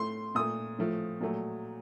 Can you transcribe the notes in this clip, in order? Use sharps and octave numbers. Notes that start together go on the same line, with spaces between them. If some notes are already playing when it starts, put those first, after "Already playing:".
Already playing: A2 A3 C6
A#2 A3 D#6
A2 F3 A3
A#2 F#3 A3